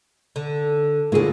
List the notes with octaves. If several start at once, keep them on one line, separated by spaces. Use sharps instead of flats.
D3
A2 D3 A#3 F4 G#4